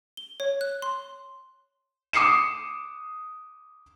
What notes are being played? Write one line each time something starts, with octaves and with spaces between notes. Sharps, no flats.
G7
C#5
F#6
C6
D6 D#6 C7 C#7 E7